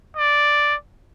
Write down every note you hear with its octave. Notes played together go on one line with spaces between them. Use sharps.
D5